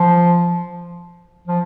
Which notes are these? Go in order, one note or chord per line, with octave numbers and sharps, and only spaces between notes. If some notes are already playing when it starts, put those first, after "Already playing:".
Already playing: F3
F3